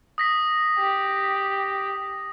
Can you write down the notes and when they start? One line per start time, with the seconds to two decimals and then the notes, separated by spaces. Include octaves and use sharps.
0.18 D#6 A#6 B6
0.79 G4